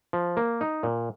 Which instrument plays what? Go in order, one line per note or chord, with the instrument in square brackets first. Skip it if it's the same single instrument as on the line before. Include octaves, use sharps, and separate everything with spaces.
[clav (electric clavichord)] F3
A#3
D#4
A#2